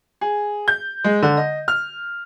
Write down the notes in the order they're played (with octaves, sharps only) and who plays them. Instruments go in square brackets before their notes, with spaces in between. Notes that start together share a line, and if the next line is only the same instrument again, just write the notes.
[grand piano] G#4
G6
G#3
D3
D#5
F6